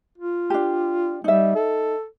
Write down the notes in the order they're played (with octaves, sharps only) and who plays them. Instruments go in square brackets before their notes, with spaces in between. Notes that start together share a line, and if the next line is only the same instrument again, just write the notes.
[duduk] F4
[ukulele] D4 G4
[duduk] G3 [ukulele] D#4 E5
[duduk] A4